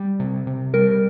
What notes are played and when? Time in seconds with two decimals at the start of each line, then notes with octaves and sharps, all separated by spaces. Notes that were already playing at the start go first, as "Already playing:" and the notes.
Already playing: G3
0.20 C3
0.47 C3
0.74 G3 A#4